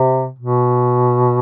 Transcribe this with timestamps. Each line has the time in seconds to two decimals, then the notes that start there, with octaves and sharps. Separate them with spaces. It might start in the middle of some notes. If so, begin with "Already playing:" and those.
Already playing: C3
0.39 B2